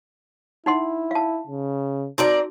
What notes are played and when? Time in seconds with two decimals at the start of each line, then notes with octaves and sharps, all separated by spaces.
0.66 D#4 E4 F#5 C6
1.11 F5 A5
1.47 C#3
2.18 C4 D#4 F#4 A#4 D5